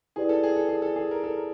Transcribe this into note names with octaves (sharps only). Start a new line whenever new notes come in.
E4 G4 G#4 B4 D5
A4
G#4
A4
G#4
A4
G#4
A#4
A4
A#4